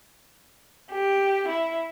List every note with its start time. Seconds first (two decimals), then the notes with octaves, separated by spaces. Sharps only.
0.90 G4
1.48 E4